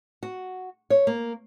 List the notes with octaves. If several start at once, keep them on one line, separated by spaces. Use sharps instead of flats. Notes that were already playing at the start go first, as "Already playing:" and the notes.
F#4
C#5
A#3